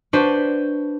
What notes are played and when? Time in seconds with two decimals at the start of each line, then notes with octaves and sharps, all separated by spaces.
0.13 D4 F#4 B4 C5